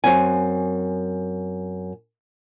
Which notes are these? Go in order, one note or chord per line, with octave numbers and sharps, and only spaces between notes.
F#2 C4 G#5